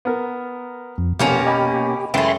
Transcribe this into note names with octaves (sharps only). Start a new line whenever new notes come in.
B3 A#4
F2
F1 B2 A#3 C#4 G4
D#5 G#5 B5
F#2 E3 G#3 A3 G5 B5 C6 A6